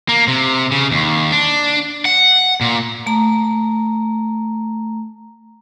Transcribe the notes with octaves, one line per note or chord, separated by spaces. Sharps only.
A#3
C3
C#3
D#2
D4
F#5
A#2
A3 A#5